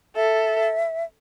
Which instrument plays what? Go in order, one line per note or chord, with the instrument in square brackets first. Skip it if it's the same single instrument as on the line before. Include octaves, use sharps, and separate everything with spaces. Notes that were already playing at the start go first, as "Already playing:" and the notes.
[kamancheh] A4 [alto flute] E5